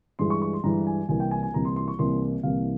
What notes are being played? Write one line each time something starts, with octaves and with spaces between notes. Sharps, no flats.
G2 E3 G#3 C6
C#6
C#6
C6
G2 E3 G#3 A#5
G#5
C2 C3 E3 A#3 G#5
G5
G#5
G#5
C2 C3 E3 A#3 A#5
C6
C6
C#6
C2 C3 E3 A#3 C6
C2 C3 E3 A#3 F5